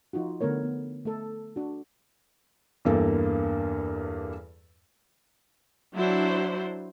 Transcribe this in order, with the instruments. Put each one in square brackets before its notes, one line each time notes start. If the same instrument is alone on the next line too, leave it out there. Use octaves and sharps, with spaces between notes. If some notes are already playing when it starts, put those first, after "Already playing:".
[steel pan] F3 D#4 F4 F#4
D3 A3 B3 A#4 C#5
B3
A3 A4
D4 F#4
[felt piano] E2 G2 A#3 A4
[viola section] F#3 D4 E4 C5